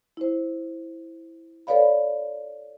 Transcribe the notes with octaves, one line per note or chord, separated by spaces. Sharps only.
E4 C5
A4 B4 C#5 D5 F5 B5